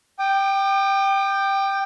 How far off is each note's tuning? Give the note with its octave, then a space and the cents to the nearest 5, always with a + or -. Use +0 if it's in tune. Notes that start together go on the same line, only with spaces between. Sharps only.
G5 +0 D6 +40